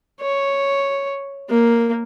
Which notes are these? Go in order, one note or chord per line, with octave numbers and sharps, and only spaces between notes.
C#5
A#3